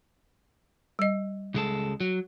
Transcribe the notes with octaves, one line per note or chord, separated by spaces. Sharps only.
G3 D#5
C#2 G#3 A4
F#3